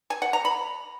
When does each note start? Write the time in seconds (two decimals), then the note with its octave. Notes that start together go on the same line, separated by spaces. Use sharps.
0.10 G#5
0.22 F#5
0.33 A#5
0.45 B5